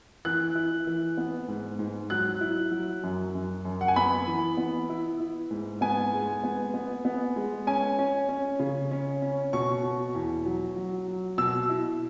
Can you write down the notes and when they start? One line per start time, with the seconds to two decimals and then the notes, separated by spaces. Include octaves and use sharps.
0.25 E3 F#6
0.55 E4
0.87 E3
1.17 B3
1.48 G#2
1.79 G#2
2.10 F#3 F#6
2.41 E4
2.72 F#3
3.03 F#2
3.35 F#2
3.65 F#2
3.81 F#5
3.88 G#5
3.96 B3 B5
4.27 E3
4.57 B3
4.89 E4
5.20 E4
5.51 G#2
5.81 B3 G#5
6.13 G#3
6.44 B3
6.74 B3
7.05 B3
7.36 G#3
7.67 C#4 G#5
7.99 C#4
8.29 C#4
8.59 C#3
8.91 C#4
9.22 C#4
9.53 B2 C#6
9.83 B2
10.15 E2
10.46 F#3
10.76 F#3
11.08 F#3
11.38 B2 E6
11.69 E4